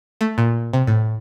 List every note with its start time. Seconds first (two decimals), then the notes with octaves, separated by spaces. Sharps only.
0.21 A3
0.38 A#2
0.73 C3
0.87 A2